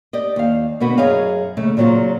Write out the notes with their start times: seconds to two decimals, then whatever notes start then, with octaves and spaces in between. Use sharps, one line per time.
0.13 G4 D5 D#5
0.36 D#2 F5
0.80 B2 D3 B3 F#4 B4
0.98 F#2 G#4 C#5 D#5 F5
1.57 D#2 C#3 A3
1.77 A#2 C#3 F#3 C4 F4